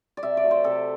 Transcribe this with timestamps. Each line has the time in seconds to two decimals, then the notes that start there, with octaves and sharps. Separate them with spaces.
0.17 D5
0.23 C3 E5
0.37 D5
0.44 F#3 A3
0.51 C5
0.64 C3 A4